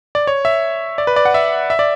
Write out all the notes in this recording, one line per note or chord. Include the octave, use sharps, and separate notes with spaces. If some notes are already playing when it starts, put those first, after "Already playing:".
D5
C#5
E5
D5
B4
D5
F#5
E5
E5
D5